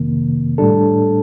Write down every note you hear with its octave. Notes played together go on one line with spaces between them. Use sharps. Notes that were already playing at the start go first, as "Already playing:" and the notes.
Already playing: F2 C3 D#3 A#3
A2 G3 D4 A4